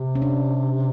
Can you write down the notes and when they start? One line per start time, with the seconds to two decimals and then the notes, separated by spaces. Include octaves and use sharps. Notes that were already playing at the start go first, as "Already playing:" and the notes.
Already playing: C3
0.15 C#4
0.22 D4